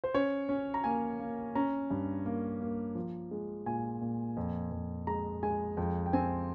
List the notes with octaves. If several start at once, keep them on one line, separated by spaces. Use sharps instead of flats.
C5
C#4 C#5
C#4
A#5
A#3 G#5
A#3
C#4 A#5
G2
A#3
A#3
F3
G#3
A#2 G#5
A#2
F2
F2
G#3 A#5
G#3 G#5
F2 G5
G5
C4 G#5